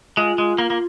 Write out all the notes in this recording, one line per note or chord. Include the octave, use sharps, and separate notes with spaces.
G#3 F4
G#3
A#3
A#3